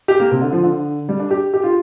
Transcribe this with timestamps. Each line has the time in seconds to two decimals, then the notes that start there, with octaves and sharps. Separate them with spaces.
0.08 G4
0.20 A#3
0.31 C3
0.41 D3
0.53 F3
0.63 D3
1.09 G3
1.20 D4
1.31 G4
1.54 G4
1.64 F4